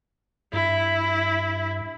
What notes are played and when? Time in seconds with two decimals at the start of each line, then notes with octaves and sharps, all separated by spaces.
0.53 G2 E4